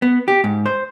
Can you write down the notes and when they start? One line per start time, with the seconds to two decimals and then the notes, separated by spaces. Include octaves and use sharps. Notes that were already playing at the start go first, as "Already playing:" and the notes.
0.02 B3
0.28 G4
0.44 G#2
0.66 C5